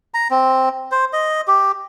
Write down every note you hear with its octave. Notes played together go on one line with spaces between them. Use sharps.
A#5
C4
C5
D#5
G4